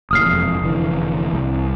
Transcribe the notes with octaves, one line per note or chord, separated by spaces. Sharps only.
F#1 D#2 A2 D#6 F6 C7
E1 F2
F1 D3 E3
C2